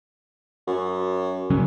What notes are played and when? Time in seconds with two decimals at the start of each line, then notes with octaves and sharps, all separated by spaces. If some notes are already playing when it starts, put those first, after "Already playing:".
0.67 F#2
1.50 C#3 F#3 C#4